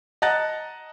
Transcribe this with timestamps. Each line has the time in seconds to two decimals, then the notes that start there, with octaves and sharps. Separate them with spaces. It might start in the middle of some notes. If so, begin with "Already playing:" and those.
0.22 D#5 F#5 A5 A#5 F#6 A6